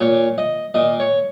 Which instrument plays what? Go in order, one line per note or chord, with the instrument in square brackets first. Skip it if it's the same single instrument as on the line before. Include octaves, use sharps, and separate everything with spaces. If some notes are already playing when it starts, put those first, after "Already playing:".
[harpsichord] A#2 C#5
D#5
A#2 D#5
C#5